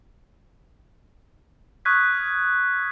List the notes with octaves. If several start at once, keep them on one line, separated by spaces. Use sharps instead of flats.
C#6 D#6 F6 F#6 G#6 B6